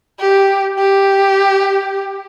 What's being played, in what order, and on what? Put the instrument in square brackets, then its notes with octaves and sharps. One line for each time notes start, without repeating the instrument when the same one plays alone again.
[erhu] G4
G4